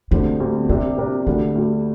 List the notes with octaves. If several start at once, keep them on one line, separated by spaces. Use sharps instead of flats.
D2 D3 G3 A#3 C4
D2 D3 G3 C4
C3 G3 A#3 D4 G4 A#4
C3 G3 D4 G4 A#4
D2 D3 G3 A#3
D2 D3 G3